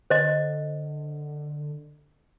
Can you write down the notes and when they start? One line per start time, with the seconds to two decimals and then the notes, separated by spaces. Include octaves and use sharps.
0.10 D3 C5 D#5